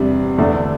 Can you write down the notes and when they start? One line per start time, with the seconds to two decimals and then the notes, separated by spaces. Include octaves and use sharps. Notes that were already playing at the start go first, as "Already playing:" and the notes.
Already playing: E2 C3 G3 D4
0.38 E2 D3 A3 D4